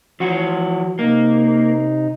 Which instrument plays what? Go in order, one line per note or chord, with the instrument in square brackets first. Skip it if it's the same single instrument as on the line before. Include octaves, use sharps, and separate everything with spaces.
[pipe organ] E3 [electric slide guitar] F3 F#4
[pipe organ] C3 D#4 [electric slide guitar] A#3